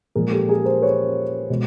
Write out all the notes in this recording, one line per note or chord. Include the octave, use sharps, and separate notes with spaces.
A#2 F3 G#3 G#4 A#4
G4 A4
G#4 A#4
A#4 C5
B4 C#5
B2 G#3